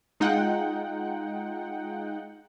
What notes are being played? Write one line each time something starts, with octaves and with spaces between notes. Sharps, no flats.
G#3 D#4 F4 F#5 G5